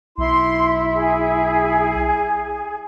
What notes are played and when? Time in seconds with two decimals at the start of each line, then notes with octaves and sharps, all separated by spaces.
0.18 B1 E4 C6
0.93 G#4